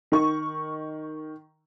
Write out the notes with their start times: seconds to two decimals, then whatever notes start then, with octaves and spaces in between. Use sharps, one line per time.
0.12 D#3 C#6